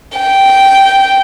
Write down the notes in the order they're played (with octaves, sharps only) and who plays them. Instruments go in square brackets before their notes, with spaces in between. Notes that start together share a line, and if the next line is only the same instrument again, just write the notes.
[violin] G5